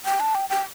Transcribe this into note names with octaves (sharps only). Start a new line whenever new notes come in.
G5
A5
G5
G5